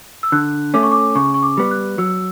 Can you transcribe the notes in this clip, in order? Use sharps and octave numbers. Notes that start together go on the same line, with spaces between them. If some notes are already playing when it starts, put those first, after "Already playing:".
E6
D3 F#6
A3 C#4 D6
C#6
D6
C#3 C#6
C#6
D6
G3 B3
F#6
F#3 E6